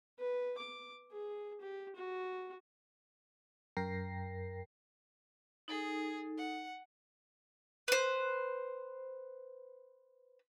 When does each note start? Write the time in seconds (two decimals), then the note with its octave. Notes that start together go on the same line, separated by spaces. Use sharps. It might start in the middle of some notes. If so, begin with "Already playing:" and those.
0.19 B4
0.58 D6
1.12 G#4
1.61 G4
1.96 F#4
3.77 F#2 A#4 G5 A#6 C7
5.68 D#4 G#4 A4
6.37 F#5
7.88 B4 C5